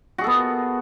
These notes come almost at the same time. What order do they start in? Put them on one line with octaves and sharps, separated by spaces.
F#4 G#4 A4 B3